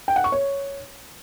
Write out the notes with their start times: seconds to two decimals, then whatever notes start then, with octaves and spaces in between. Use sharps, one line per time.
0.08 G5
0.16 F#5
0.24 C#6
0.32 C#5